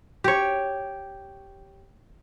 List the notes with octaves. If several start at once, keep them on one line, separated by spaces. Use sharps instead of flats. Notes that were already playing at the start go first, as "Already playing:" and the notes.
G4 C#5